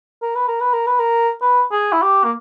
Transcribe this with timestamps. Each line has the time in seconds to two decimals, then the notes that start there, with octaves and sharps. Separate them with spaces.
0.22 A#4
0.35 B4
0.48 A#4
0.61 B4
0.73 A#4
0.87 B4
1.00 A#4
1.42 B4
1.72 G#4
1.93 E4
2.02 G4
2.24 A#3